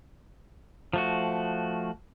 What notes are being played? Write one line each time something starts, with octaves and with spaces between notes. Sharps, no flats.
F3 A3 F#4